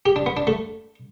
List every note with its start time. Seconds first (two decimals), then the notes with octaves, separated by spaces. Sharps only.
0.06 G4
0.16 D4
0.26 B3
0.37 D4
0.47 A3